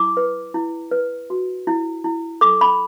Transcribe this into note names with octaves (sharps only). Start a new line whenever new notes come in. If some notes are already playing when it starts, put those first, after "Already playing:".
Already playing: E4 D6
B4
E4
B4
F#4
E4
E4
A4 D6
B5